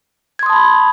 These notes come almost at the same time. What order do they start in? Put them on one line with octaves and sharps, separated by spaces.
G#6 C6 D#6 A5 B5